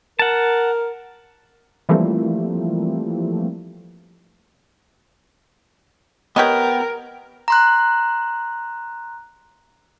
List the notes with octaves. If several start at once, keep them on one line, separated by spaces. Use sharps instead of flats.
A#4 F#5 A5
E3 F3 G3 A3 A#3 C4
B3 G4 A#4 C#5 D#5 G5
A#5 C6 F#6